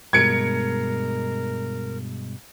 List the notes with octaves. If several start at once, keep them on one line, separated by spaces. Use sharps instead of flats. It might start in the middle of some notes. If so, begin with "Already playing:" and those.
G2 B2 G#3 A#4 G#6 C#7 D7